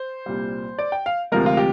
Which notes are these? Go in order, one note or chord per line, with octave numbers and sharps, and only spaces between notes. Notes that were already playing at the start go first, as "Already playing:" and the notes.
Already playing: C5
C2 A#2 G3
D5
G5
F5
D2 C3 F3 G#3 A#4
F4
G4